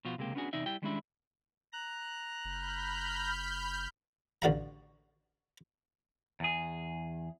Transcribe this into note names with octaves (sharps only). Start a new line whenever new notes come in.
B2 F3 F4 F#4
C#2 C3 G#3 A#3 G4
B3 C#4 D4 F#4 G#4
E2 C3 D#4 D5 E5
G3 E4 G5
D#3 G3 G#3 C#4 D4 E4
A#5 F#6
F#1 B5 F6 G6
A1 D3 F#4 F5 A#5
E2 G#4